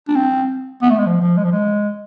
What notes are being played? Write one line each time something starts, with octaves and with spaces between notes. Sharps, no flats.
D4
C4
B3
A3
G#3
F3
F3
G#3
F3
G#3